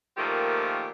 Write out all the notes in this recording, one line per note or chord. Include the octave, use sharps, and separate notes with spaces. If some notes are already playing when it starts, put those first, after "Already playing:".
A#2 D#3 F3 A3 A#3 G4